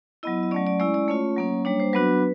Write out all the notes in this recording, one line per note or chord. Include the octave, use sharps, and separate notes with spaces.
F#3 B3 E4 D#5
D#5
F#3 A3 C#4 D5
D5
G#3 C#4 E4 D5
D5
A3 C#4 F4 C#5
F#3 A#3 C#4
G3 A#3 D4 C#5
C5
F#3 B3 D4 F#4 B4